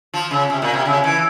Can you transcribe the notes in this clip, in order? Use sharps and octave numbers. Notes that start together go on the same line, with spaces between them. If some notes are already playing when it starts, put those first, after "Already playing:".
F3
C#3
C3
A#2
C3
C#3
E3